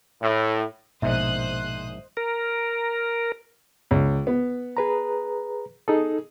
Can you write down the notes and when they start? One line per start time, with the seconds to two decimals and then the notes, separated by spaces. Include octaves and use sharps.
0.22 A2
1.02 A#1 G#2 B2 C5 D#5 E5 D#6 F#6
2.17 A#4
3.91 C#2
4.27 B3
4.77 G#4 B4 A#5
5.88 D#4 G#4 A4